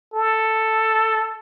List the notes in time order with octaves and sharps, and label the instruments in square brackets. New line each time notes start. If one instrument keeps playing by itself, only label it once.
[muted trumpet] A4